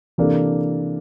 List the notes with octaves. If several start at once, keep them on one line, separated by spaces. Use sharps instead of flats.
C3 E3 A#3 D4 A4